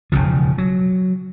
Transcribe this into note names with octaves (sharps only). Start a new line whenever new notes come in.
E1 D2 C#3 F3
F#3